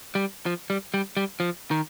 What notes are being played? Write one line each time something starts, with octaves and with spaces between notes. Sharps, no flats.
G3
F3
G3
G3
G3
F3
D#3